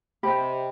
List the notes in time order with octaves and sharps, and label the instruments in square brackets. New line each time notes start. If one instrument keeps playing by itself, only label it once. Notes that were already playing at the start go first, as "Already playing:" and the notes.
[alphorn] C3 [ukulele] G4 C5 D#5 B5